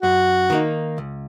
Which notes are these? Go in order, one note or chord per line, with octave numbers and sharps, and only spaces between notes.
F#2 F#4
D#3 A#3 D#4
C#2